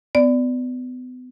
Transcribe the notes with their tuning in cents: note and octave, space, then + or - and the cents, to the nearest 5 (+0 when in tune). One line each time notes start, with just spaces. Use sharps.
B3 +35 D5 +0